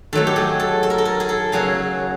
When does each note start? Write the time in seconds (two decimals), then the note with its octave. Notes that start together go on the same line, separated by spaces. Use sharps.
0.13 D#3 F#3 A3 A4
0.27 G4
0.36 G#4
0.60 A4
0.83 A4
0.90 A#4
0.98 A4
1.05 A#4
1.20 G#4
1.29 A4
1.52 C#3 F#3 A#3 G#4